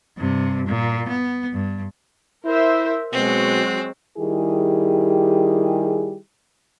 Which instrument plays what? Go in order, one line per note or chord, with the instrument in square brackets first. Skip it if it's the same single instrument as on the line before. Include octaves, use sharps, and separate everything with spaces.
[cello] G2 C3
A#2
B3
G2
[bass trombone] E4 [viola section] A#4 C5 E5
[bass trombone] B2 [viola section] F#3 G#3 F#4 [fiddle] C4
[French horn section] D#3 G3 E4 G4 G#4